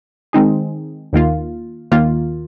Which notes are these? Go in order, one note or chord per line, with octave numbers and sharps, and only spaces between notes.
D#3 G#3 C4 D#4 G#4
D#2 D#3 A#3 F4
D#2 D#3 A#3 F4